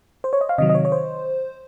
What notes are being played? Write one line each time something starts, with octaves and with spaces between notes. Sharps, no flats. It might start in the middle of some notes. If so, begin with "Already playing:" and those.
C5
C#5
D#5
F5
C3 D#3 F#3 D#5
D#5
C#5
C#5
C5